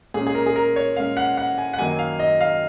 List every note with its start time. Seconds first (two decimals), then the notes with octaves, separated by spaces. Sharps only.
0.14 A#2 G#3 C#4 G#4
0.27 G#4
0.35 A#4
0.46 G#4
0.56 A#4
0.76 C#5
0.96 A#2 G#3 C#4 F5
1.17 F#5
1.37 F#5
1.58 G#5
1.73 F#5
1.78 F#2 D#3 F#3 A#3 G#5
1.99 F5
2.20 D#5
2.41 F5